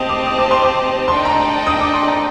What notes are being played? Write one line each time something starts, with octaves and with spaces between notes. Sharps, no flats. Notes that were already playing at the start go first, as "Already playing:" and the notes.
Already playing: C4 G4 C5 D#5 A5 D#6
D6
D#6
D6
C6
D6
D4 A4 D#5 G5 C6
A#5
D#6
D6
C6
A#5